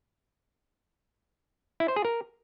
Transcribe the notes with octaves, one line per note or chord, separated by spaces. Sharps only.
E4
C5
G#4
A#4